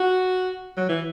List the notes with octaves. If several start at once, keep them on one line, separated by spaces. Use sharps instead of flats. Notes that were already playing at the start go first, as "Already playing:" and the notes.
Already playing: F#4
F#3
E3